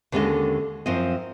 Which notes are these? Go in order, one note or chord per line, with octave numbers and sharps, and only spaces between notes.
D#2 D3 G#3 C#4 A4 D#5
F#2 F3 C4 D#5